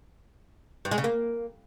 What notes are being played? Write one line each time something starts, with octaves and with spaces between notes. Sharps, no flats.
G2
G#3
C#3
A#3